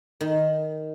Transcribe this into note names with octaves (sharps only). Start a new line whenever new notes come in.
D#3